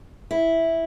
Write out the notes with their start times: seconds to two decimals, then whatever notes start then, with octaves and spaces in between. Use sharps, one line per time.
0.31 E4